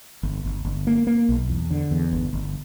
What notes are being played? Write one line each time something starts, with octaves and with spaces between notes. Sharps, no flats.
G1
G1
G1
A#3
A#3
B1
E2
D3
E2
G1
G1